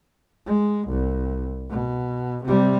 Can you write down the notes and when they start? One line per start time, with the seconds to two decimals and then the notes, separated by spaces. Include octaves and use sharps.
0.47 G#3
0.89 C2
1.70 B2
2.46 C3 G3